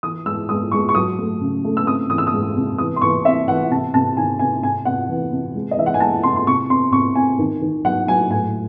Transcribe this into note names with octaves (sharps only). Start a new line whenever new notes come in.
E3 D#6
G#3 E6
G#3 D#6
G#3 C#6
C#6
F#3 D#6
A3
C#3
A3
E6
C4 D#6
E3 D#6
E6
D#6
G#3
C3
E3 D#6
C6
E3 C#6
C4 E5
E3 F#5
C3 A5
C3 A5
D#3 G#5
C3 G#5
C3 G#5
C3 F#5
E3
C3
G#3
D#5
E3 E5
F#5
G#5
G#3 A5
C3 C6
C6
C3 C#6
C4 C6
C3 C#6
C4 G#5
D#3
D#3
F#3 F#5
F#3 G#5
A2 G#5